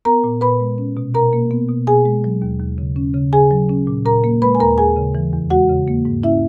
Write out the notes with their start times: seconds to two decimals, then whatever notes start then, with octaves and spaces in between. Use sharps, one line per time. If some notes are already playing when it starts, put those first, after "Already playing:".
0.05 B3 A#4 A#5
0.24 A#2
0.41 A#2 B4 B5
0.60 G#3
0.78 C#4
0.97 B2
1.15 B2 A#4 A#5
1.33 A#3
1.51 B3
1.69 B2
1.87 B2 G#4 G#5
2.05 G#3
2.24 F#3
2.42 D#2
2.60 D#2
2.78 C#3
2.96 C#4
3.14 C#3
3.33 C#3 G#4 G#5
3.51 F#3
3.69 C#4
3.87 A#2
4.05 A#2 A#4 A#5
4.24 A#3
4.42 G#3 B4 B5
4.55 G#5
4.60 D#2 A#4 A#5
4.78 D#2 G#4 G#5
4.96 C#3
5.15 E3
5.33 E2
5.50 G#3 F#4 F#5
5.69 C#3
5.88 A#3
6.05 G#2
6.23 C#4 E4 E5